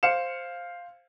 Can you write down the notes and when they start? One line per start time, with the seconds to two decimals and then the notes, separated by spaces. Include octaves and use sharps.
0.03 C5 F5 C#7 E7